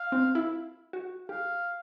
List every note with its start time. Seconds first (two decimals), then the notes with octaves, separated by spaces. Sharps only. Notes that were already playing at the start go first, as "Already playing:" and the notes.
Already playing: F5
0.12 C4
0.35 E4
0.93 F#4
1.29 G4 F5